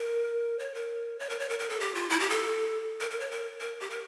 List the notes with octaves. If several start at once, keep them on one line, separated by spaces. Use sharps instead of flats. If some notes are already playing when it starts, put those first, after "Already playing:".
Already playing: A#4
C#5
A#4
C#5
A#4
C#5
A#4
A#4
A4
G4
F4
E4
G4
A4
A#4
A#4
C#5
A#4
A#4
G4
A#4